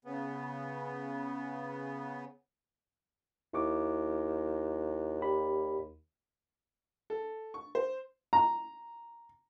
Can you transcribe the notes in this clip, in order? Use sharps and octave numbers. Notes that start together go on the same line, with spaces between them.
C#3 B3
D#2 E4 C#6 D6
G4 D5 B5
A4
C#6
C5
A#5